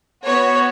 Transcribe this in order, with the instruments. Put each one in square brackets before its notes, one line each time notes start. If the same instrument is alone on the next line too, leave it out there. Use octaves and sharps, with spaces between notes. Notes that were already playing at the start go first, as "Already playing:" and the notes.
[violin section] B3 F#4 C#5